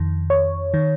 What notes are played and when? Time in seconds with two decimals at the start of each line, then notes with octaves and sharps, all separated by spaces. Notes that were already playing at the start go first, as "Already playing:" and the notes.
Already playing: F2 D#3
0.30 C#5
0.74 D#3